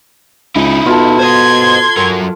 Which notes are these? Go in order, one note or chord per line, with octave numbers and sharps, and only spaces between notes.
C#2 D#4 E4
B2 F4 A4
C5 D#5 C6 G#6
F#3 A#4